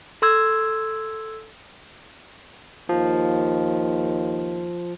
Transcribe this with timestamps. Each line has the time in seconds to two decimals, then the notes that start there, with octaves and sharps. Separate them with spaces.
0.22 A4 C6 E6 G#6
2.89 D#2 F3